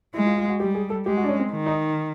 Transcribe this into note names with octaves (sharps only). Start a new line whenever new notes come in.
G#3 E4
F4
F4
F#4
G3 G4
G#4
A4
G#3 G4
F#4
D4
C#4
C4
D#3
D#4